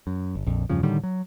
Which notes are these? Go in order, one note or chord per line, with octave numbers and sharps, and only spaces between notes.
F#2
G1
A#1 F2
E2 G2 C#3 F3
A2 D3 D#3 G3
F#3